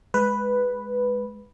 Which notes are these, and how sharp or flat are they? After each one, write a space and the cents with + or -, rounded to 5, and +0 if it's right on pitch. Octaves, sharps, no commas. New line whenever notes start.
G#3 +0 B4 +0